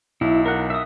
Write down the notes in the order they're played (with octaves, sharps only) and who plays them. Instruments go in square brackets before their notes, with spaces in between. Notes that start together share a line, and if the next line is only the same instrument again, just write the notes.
[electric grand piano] B1 [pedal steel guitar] E4
[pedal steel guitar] A#4 F#5
E5 D#6